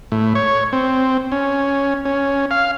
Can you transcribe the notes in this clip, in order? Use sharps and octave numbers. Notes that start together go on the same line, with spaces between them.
A2
C#5
C4
C#4
C#4
F5